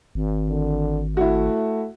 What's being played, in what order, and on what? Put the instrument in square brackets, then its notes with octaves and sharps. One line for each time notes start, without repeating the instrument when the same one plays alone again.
[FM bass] G#1
[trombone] D3
[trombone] A3 [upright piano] E4 F#4